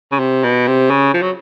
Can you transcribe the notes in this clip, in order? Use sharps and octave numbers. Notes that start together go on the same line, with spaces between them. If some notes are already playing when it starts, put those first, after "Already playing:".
C#3
C3
B2
C3
C#3
F3
F#3